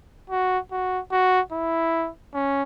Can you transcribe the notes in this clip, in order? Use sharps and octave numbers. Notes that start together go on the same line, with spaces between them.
F#4
F#4
F#4
E4
C#4